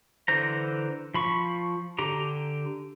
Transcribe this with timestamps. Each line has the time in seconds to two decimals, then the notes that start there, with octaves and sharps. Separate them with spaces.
0.28 D3 E3 C5 A#5
1.14 F3 B5 C#6
1.99 D3 G4 A#5